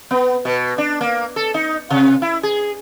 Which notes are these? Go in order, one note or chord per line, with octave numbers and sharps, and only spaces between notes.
B3
B2
D4
A#3
A4
D#4
C3
E4
G#4